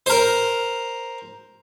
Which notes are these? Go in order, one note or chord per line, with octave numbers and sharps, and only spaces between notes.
A#4 C5